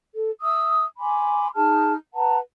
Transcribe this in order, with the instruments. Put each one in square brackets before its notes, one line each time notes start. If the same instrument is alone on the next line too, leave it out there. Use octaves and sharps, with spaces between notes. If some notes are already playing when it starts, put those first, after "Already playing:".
[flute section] A4
E5 D#6 E6
G#5 B5 C6 D6
D#4 G#4 A5 F6
B4 F#5 A5 A#5